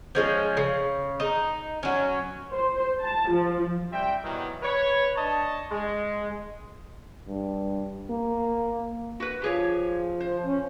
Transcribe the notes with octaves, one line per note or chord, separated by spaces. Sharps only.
F3 G#3 C#4
C#3
D#4
F#3 C#4
C5
A5
F3
G3 C4 E5 G5
B2 D#3 E3 F#3 G3
B4 C#5
D4 C#5 D#5 A5
G#3
G2
A#3
F#4 B4
F3 G4 G#4 C#5
C5
C#4